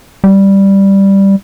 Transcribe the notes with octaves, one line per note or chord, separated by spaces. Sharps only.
G3